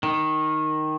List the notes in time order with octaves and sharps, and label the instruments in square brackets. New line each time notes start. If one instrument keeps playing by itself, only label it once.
[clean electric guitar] D#3